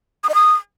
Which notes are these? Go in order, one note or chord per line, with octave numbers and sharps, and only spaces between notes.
D#6
D#5
D#6